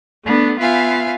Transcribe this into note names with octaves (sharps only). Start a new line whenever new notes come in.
A3 B3 D4
B3 F4 E5 F5 G#5